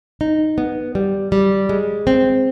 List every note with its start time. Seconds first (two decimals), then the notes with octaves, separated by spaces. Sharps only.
0.21 D#4
0.58 B3
0.95 G3
1.32 G3
1.69 G#3
2.07 C4